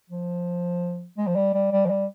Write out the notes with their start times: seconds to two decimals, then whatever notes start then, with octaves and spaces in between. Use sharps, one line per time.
0.10 F3
1.18 G#3
1.27 F3
1.36 G3
1.54 G3
1.72 G3
1.86 F3
1.90 G3